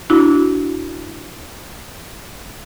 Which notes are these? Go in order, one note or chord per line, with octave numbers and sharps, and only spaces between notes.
D4 E4 F#4